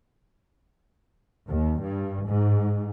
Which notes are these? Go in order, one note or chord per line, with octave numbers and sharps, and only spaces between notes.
D#2
G2
G#2